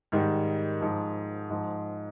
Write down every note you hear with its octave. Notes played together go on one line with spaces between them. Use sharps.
G#2 D#3 G3
G#2 F3
G#2 F3